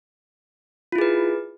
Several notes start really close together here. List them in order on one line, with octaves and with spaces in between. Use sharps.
F4 E4 G#4 B4